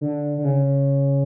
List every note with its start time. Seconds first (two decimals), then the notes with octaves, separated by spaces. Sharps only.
0.01 D3
0.38 D3
0.45 C#3